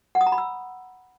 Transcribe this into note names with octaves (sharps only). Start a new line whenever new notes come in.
F#5
D#6
A#5
B5
E6